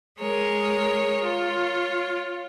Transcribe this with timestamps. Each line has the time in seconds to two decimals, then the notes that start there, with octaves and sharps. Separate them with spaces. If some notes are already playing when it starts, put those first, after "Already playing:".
0.19 G#3 G#4 A#4 C#5
1.24 F4 C#5